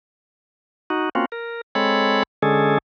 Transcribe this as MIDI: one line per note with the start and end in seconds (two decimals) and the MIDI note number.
0.90 1.09 63
0.90 1.09 66
1.15 1.25 58
1.15 1.25 60
1.15 1.25 61
1.15 1.25 65
1.15 1.25 66
1.32 1.61 70
1.75 2.23 56
1.75 2.23 60
1.75 2.23 69
1.75 2.23 73
1.75 2.23 83
2.42 2.78 50
2.42 2.78 56
2.42 2.78 61
2.42 2.78 68
2.42 2.78 69